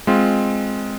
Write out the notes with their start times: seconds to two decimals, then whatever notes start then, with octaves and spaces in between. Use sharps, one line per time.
0.07 G#3 C4 F4